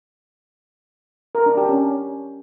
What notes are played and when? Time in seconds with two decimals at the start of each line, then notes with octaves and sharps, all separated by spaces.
1.35 A#4
1.46 D4
1.57 G4
1.69 C#4